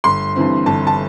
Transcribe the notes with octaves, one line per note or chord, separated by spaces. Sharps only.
G1 C6
G2 E3 C4
G1 A5
A5